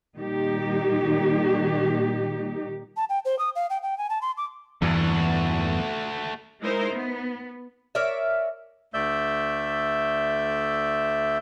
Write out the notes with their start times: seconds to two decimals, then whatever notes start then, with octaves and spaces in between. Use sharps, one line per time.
0.17 A#2 D#3 G3 D#4 G4
2.96 A5
3.10 G5
3.25 C5
3.39 D#6
3.56 F5
3.70 G5
3.83 G5
3.98 G#5
4.10 A5
4.22 C6
4.37 D6
4.82 E2 G2 E3 A3 F#4
6.62 G#3 D#4 E4 A#4 C5
6.92 B3
7.95 A#4 C#5 D5 E5
8.94 D2 A3 D5 E5 E6 G6